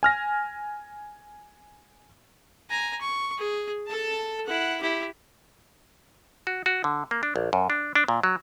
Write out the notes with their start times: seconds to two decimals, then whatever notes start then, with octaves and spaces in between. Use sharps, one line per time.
0.03 G#5 F6 A#6
2.70 G#5 A#5
3.01 C#6
3.38 G#4
3.87 A4 A5
4.46 E4 F#5
4.81 E4 G4
6.47 F#4
6.66 F#4
6.84 D3
7.11 A#3
7.23 D4
7.36 A#1
7.53 F#2
7.70 D4
7.95 D4
8.08 A#2
8.23 F#3